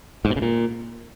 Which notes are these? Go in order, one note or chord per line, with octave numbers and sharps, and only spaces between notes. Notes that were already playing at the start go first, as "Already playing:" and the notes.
G#2
B2
C#3
A#2